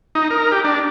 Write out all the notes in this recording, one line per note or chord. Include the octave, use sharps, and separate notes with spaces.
D#4
A#4
G4
D4